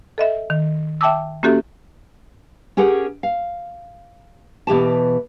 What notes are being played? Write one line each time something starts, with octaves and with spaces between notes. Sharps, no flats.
A4 D#5 E5
D#3
E5 G5 A5 D6 E6
A#3 C#4 F#4 G4 A4 E5
C#4 G4 G#4 A#4 F#5
F5
B2 E3 G4 A5